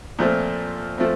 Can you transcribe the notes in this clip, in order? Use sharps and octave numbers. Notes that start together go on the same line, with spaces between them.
A#2 F3 A3 C4
F3 A3 C4